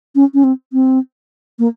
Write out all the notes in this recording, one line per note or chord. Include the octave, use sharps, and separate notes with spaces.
C#4
C#4
C4
C4
A#3